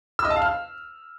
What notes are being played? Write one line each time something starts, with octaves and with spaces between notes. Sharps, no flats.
E6
D#5
A5
F5
F6